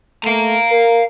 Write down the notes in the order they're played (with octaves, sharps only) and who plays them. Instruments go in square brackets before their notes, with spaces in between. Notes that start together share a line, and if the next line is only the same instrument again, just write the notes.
[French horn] A3 [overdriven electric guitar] F5 A#5
[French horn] A#4